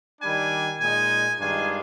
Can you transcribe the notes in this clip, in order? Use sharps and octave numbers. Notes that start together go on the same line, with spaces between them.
D#3 G3 D4 G#5
A#2 G#3 D#4 G#5
G2 D#3 G#3 D4 F4 G#5